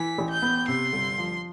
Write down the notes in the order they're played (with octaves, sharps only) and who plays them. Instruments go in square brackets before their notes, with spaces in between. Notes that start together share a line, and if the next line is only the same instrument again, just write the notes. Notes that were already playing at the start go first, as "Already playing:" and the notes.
Already playing: [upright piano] E3 [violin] B6
[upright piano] A1
[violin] G6
[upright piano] B3
[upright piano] C3 [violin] C6
[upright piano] G1
F3